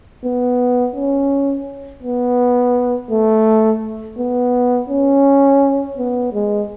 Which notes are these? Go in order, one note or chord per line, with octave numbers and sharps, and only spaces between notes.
B3
C#4
B3
A3
B3
C#4
B3
G#3